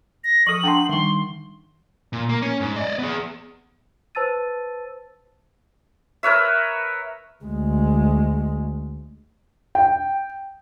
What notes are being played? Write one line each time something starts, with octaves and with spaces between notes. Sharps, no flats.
A#6
F3 A4 C#6 D#6 F#7
D4 F#5 G5 A5 C6
D#3 G3 C6 C#6
A#2
A#3
C#4
G#2
D5 D#5
B3 G#4
B4 C5 A5 E6 A6 D#7
A#4 B4 C#5 E5
D2 G#3
G5